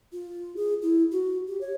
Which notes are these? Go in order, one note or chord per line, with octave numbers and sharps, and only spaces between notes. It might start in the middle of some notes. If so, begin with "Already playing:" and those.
F4
G#4
E4
F#4
G4
C#5